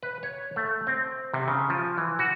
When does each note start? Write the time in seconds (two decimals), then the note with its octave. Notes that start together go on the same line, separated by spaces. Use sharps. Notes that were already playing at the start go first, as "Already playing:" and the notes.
0.03 B4
0.23 C#5
0.56 A3
0.87 C4
1.34 C3
1.48 C#3
1.70 F3
1.98 E3
2.19 F#4